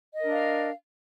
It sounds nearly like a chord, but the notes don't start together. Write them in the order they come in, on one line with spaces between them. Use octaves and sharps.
D#5 A#4 D4 F5